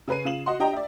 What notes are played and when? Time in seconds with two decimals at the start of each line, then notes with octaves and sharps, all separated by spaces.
0.08 C#3 C#4 B4 C7 D#7
0.25 C#3 F4 E7 F#7
0.46 F#4 D#5 F#5 C6
0.60 D4 G4 D#5 G5 A#5
0.73 D5 E5